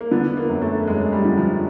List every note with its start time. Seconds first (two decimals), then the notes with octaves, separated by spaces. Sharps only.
0.01 A#3
0.11 D3 B3
0.37 A#3
0.49 F#2
0.62 A3
0.87 F#2 G#3
1.12 G3
1.25 D3
1.37 F3